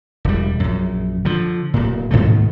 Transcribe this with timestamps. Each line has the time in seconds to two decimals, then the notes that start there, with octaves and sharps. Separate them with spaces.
0.25 E1 G3
0.60 A#1 F#2
1.25 D3 F3
1.74 D1 A#2
2.11 G#2 B2 D#3 A3